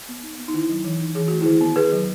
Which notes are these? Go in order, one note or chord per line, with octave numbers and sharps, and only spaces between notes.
B3
D#4
B3
D#4
D#3 E4
F#3
E3
D#4
E3 G#4
A3 F#4
D#3 E4 G#4
B3
D#3 G#4 B4
F#3